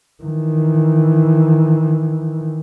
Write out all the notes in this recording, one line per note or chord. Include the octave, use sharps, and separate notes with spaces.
D#3 E3